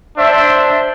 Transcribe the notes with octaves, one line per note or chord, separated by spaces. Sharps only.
D4 C5 E5